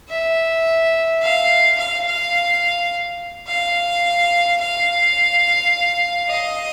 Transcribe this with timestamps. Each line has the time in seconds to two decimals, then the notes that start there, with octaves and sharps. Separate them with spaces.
0.09 E5
1.22 F5
1.78 F5
2.06 F5
3.48 F5
4.60 F5
6.29 D#5